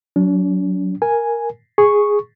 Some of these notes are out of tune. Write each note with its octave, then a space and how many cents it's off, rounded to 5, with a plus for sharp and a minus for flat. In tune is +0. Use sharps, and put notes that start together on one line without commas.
F#3 +0 D4 -45
A#4 +0 G#5 +0
G#4 +0 C#6 -5